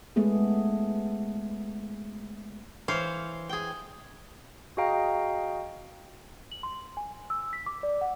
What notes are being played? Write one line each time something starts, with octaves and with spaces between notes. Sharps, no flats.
G#3 A3 B3 G#4
E3 C5 C#5 F5
G#4 G5
F#4 G#4 D#5 F5 G5 A#5
F#7
C6
G#5
E6
B6
D6
D5
F#5